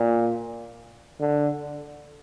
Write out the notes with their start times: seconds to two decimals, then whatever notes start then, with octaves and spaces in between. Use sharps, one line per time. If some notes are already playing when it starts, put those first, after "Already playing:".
Already playing: A#2
1.20 D3